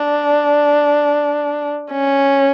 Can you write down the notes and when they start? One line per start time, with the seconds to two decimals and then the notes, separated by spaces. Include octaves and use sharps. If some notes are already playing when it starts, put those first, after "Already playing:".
Already playing: D4
1.92 C#4